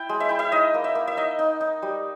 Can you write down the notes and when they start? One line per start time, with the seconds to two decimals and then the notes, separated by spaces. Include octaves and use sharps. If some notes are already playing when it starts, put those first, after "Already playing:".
Already playing: E4 G5
0.09 G#3
0.20 E5
0.29 E4 G5
0.39 E5
0.52 D#4 D#5
0.74 A#3
0.84 E5
0.95 A#3
1.07 E5
1.17 D#4 D#5
1.39 D#4
1.61 D#4
1.82 G3